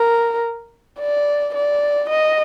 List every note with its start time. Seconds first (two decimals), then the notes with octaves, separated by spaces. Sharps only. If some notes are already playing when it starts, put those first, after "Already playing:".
Already playing: A#4
1.00 D5
1.54 D5
2.10 D#5